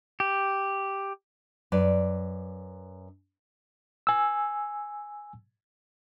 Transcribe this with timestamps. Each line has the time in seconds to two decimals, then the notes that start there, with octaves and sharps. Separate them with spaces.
0.20 G4
1.72 F#2 B4 D5
4.07 G#5 E6